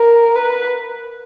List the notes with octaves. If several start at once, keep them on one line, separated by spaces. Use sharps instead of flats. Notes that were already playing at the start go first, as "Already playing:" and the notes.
Already playing: A#4
B4